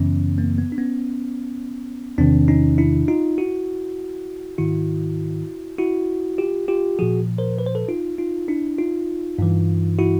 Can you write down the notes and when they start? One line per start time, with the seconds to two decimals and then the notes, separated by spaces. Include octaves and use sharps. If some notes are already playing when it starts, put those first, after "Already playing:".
Already playing: F#2 C#3 E3 B3 C#4
0.38 A#3 C4
0.58 B3
0.72 D4
0.78 B3 C#4
2.18 E2 C3 D#3 C4 D4
2.48 C#4 D#4
2.78 D4 E4
3.08 D#4 F4
3.38 E4 F#4
4.58 G#2 D#3 E4 F#4
5.78 E4 F#4
6.38 F4 G4
6.68 F4 G4
6.99 A#2 F3 F#4 G#4
7.38 A#4 C5
7.58 B4
7.66 C5
7.75 A4 B4
7.88 D#4 F4
8.18 D#4 F4
8.48 D4 E4
8.78 D#4 F4
9.39 G2 E3
9.99 E4 F#4